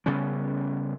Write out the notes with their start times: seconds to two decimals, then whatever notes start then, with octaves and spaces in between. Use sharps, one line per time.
0.06 C#3 G3 B3 C#4